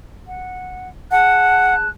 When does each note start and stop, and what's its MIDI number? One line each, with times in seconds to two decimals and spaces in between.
0.25 0.88 78
1.11 1.88 68
1.11 1.75 78
1.11 1.88 81
1.11 1.88 90